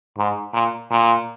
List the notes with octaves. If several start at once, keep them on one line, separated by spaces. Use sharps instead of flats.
G#2
A#2
A#2